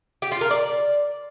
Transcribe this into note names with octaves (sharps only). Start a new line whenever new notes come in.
G4
F4
A#4
D5